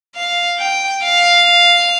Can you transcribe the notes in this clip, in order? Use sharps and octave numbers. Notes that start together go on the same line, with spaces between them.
F5
G5
F5